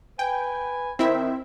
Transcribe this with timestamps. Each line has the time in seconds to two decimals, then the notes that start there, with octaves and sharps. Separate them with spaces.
0.19 B4 G5 G#5
0.99 D#3 C4 E4 E5